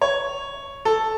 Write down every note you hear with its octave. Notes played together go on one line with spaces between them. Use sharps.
C#5
A4